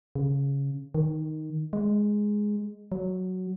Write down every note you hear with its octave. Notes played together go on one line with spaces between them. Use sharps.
C#3
D#3
G#3
F#3